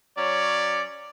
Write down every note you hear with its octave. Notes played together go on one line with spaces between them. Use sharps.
F#3 C#4 C#5 D5